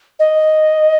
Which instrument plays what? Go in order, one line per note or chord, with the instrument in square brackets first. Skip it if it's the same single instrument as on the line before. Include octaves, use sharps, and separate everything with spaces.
[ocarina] D#5